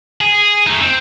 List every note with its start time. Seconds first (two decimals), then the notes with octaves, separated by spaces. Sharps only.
0.21 G#4
0.67 A3 D#4
0.82 C4